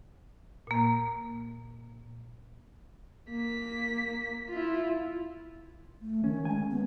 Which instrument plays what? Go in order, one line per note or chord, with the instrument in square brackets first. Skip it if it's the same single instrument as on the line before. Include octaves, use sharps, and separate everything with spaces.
[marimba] A#2 A#3
[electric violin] A#3 B6
E4 F4
[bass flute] A3
[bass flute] D#3 [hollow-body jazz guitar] C#4
[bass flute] G#3 [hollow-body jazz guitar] G#5
[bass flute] B3